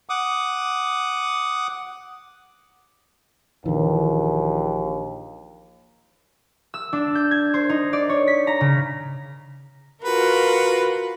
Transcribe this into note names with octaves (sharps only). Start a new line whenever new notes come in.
F#5 D6 D#6
A#1 D#2 D#3 E3
E6
D4
G6
G#6
C5
D#4
D5
C#5
B6
A#5
C#3
F4 F#4 A#4 B4